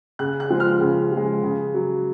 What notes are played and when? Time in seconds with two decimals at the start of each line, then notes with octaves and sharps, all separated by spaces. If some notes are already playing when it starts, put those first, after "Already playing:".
0.19 C#3 F#6
0.40 F#6
0.50 F3 G#3
0.60 F6
0.81 C#3
1.12 F3 G#3
1.43 C#3
1.74 F#3